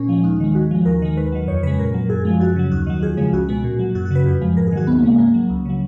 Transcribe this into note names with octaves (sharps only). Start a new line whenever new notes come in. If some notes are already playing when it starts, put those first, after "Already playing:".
Already playing: A#2 C#4
F3 G#3
D#2 D#4
D#3 G#3
G#2 F#4
F3 G#3
D#2 A#4
D#3 G#3
D#2 B4
D#3 F#3
F2 C#5
C#3 G#3 B4
A#2 A#4
F#3
F#2 G#4
F3 G#3
F#2 F#4
C#3 F#3
D#2 F#4
D#3 F#3
F2 G#4
C#3 F3 G#3
C#2 F#4
B2 G#3
A#2
F#3
F#2 F#4
F#4
C#3 F#3 B4
F2 B4
F3 G#3
G#2 A#4
G#4
D#3 F#3 F#4
D#2 B3
A#3
C#3 G#3
G#2 A#3
F#3
C#2
C#3 F#3